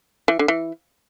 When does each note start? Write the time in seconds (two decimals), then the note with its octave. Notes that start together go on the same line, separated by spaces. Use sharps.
0.28 E3
0.39 D3
0.48 E3